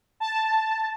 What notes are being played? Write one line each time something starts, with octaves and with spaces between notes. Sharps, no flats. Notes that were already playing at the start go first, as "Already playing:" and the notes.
A5